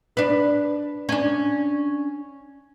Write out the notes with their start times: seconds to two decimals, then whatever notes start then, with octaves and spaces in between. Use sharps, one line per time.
0.17 D4 B4
1.09 C#4 D4